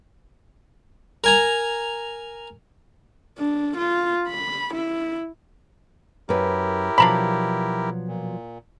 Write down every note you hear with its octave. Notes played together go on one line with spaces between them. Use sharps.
A#4 G#5 A#5
D4
F4
B5
E4
F#2 E4 G4 A#4 B4
B2 F3 F#3 D4 A#5 B5
A#2